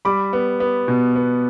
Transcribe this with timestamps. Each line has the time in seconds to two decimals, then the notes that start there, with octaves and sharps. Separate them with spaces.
0.05 G3 B5 D6
0.33 B3
0.60 B3
0.88 B2
1.16 B3